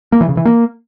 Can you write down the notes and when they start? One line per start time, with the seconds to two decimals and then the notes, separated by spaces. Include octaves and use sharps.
0.12 A#3
0.21 E3
0.29 C#3
0.37 E3
0.45 A#3